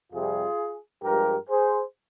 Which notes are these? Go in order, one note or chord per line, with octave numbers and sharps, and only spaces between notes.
F2 C3 G3 F4 G#4
G2 F3 G#3 G4 A#4
G#4 C5